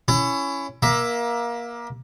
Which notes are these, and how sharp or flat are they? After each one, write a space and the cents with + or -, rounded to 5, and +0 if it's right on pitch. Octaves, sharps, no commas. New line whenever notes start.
C#4 +5 E4 +20
A#3 +25 E5 +5